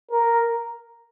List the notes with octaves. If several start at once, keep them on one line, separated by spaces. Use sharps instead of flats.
A#4